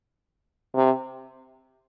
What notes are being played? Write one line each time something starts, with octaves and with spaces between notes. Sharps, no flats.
C3